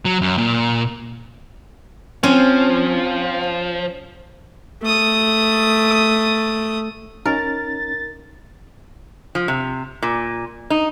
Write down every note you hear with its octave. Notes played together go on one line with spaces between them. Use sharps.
F#3
F#2
A#2
F3 C4 C#4
A3 D#6
C#4 D#4 A#4 A6
F3
C3
A#2
D#4